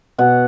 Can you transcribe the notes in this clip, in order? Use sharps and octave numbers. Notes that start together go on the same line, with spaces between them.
B2 F#5